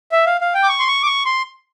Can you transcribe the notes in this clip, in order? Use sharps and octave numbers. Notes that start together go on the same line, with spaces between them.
E5
F5
F5
G5
D6
C#6
C6
C#6
D6
C#6
C6